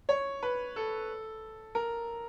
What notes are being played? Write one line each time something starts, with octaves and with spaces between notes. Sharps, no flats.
C#5
B4
A4
A#4